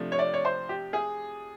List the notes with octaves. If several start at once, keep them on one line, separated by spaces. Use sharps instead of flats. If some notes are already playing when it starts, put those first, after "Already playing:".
Already playing: C3 F3 A3 D4
C#5
D5
C#5
C5
G4
G#4